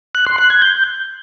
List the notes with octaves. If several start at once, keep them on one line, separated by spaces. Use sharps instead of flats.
F#6
C6
F#6
G#6
G6